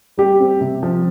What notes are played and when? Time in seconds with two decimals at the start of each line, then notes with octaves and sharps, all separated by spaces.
0.18 G3 G4
0.40 C4
0.61 C3
0.83 F3